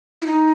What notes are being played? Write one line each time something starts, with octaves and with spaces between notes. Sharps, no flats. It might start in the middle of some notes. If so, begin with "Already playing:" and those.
E4
D#4